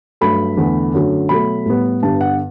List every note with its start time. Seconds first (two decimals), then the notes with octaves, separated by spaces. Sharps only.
0.21 G2 F#3 A3 B5
0.57 E2 D3 A3
0.94 F#2 D3 F#3 A3
1.29 B2 F#3 A3 B5
1.66 A2 G3 B3
2.02 G2 D3 G3 B3 A5
2.21 F#5